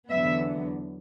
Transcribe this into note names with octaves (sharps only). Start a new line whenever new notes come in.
E2 D3 F#3 B3 E5